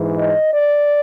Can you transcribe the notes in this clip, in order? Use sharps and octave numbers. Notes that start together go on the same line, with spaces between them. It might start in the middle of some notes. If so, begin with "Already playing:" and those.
Already playing: G#2 E3
D#5
D5